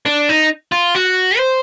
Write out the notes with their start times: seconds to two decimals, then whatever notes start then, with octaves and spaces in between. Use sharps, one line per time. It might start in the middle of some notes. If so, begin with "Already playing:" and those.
0.06 D4
0.29 D#4
0.72 F4
0.95 F#4
1.37 C5